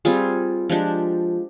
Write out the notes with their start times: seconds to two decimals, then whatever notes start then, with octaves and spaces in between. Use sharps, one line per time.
0.05 G3 C4 F4 G#4
0.69 F3 G#3 D4 G4